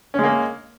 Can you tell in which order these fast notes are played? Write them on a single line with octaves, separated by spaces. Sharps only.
C#4 G#3 A#3